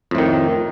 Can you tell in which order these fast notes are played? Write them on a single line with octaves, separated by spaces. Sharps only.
F2 A2 D#3